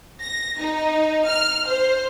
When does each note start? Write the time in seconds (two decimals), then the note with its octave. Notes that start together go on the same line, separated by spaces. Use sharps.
0.20 A#6
0.60 D#4
1.26 F6
1.66 C5